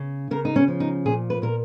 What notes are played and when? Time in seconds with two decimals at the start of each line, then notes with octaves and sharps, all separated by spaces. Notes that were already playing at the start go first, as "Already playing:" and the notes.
Already playing: C#3
0.31 C#3 A#4
0.45 D#4
0.56 C#4
0.68 F3
0.80 D#4
1.05 A#2 G#4
1.30 B4
1.42 A#2 A#4